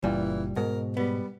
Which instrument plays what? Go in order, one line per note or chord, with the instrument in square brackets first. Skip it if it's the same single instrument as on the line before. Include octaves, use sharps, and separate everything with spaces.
[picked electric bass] F#1 A#2 [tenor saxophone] E3 [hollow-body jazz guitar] G3
[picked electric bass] G#2 B2 [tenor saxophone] A#4
[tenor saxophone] G3 [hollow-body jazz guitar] B3